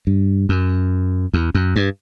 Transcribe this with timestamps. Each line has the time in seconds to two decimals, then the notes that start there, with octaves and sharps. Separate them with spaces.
0.07 G2
0.49 F#2
1.34 E2
1.55 F#2
1.76 G2